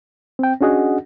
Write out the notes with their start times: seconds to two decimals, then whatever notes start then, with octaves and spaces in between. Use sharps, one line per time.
0.39 C4 G5
0.61 C#4 D4 F#4 G#4 D#5 F#5